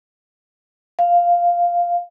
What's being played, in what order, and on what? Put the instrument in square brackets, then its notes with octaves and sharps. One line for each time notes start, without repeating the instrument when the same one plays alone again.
[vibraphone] F5